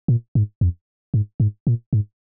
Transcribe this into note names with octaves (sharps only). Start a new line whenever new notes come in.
A#2
G#2
F2
G#2
G#2
A#2
G#2